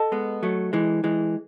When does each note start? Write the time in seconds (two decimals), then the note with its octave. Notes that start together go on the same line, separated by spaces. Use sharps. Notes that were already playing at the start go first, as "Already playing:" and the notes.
Already playing: A4 D#5 A5
0.12 G#3 B3
0.43 F#3 A3
0.73 E3 G#3
1.04 E3 G#3